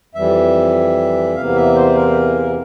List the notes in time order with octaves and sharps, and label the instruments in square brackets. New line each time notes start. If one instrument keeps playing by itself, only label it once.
[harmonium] F2 E3 G3 E5
E2 C3 E3 A#3 F5
E5
C5
A#4